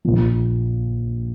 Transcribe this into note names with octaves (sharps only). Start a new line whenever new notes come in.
A#1 A#2 F3